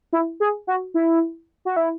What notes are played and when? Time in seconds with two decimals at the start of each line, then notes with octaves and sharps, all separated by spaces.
0.13 E4
0.40 G#4
0.67 F#4
0.94 E4
1.65 F#4
1.76 E4